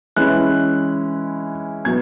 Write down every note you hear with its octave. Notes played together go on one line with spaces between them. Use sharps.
E3 G#3 C#4 E4 F#6
B2 F#3 B3 G#6